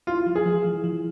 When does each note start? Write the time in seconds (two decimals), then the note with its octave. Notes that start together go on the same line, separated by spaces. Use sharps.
0.07 E4 F4
0.27 F3
0.36 G#4
0.46 F3
0.64 F3
0.84 F3